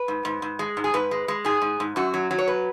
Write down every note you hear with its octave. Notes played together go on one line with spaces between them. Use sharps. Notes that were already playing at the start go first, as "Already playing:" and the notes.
Already playing: B4
G#2
G#2
G#2
G#3
G#2
G#4
G#2 B4
G#3
G#3
G#2 G#4
G#2
G#2
F#2 F#4
F#3
F#3
C#5
B4